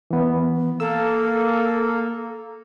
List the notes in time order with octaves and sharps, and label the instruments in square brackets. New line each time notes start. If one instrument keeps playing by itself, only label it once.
[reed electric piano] E3 B3
[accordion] A#3 [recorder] A4 [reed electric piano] E6